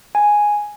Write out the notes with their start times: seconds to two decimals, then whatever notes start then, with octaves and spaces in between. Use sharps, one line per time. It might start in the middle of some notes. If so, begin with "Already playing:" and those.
0.15 G#5